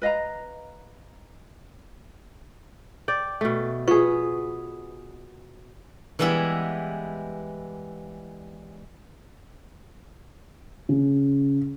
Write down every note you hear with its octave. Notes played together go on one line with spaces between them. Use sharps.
B4 D#5 F5 A#5
D5 G5
B2 A3
B3 F4 G#4 B4 C#6
E3 G3 G#3 B3 E4
C#3